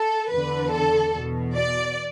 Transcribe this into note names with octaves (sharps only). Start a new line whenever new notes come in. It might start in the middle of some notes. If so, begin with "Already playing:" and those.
Already playing: A4
E2 D3 B4
A4
E2 B2
D5